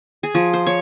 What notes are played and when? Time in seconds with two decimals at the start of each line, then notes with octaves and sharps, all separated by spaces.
0.23 G#4
0.35 F3
0.53 C5
0.67 C#5